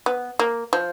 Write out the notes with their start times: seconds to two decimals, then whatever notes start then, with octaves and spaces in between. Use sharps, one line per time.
0.06 B3
0.39 A#3
0.73 F3